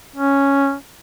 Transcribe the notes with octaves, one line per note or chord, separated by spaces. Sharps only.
C#4